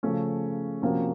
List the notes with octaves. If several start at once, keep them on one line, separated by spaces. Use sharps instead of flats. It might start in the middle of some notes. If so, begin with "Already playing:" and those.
C#3 F3 A3 C#4
C3 F3 A#3 C#4 F#4